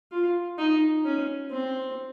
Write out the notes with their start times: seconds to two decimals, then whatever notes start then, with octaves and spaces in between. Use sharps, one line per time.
0.12 F4
0.58 D#4
1.05 C#4
1.51 C4